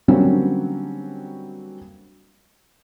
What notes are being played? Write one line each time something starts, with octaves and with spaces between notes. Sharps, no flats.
D3 F#3 G3 A#3 C4 C#4